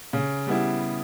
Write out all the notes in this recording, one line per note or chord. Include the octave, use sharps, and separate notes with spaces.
C#3
G3 B3 E4